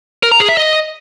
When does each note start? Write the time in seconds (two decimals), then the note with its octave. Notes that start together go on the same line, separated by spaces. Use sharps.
0.23 A#4
0.32 A#5
0.40 G#4
0.49 E5
0.57 D#5